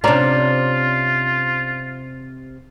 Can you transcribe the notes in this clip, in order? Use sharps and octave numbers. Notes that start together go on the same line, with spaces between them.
C3 C#4 D4 F4 D5 A#5